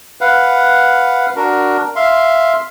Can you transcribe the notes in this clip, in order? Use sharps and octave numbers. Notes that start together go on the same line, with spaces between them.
B4 F5 F#5
D4 F#4 A#4
E5 F5 C6